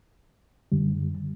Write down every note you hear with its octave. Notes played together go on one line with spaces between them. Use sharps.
F#2 D3 G3